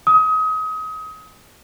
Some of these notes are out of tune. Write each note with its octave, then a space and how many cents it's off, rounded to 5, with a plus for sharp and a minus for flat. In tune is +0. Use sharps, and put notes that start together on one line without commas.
D#6 +30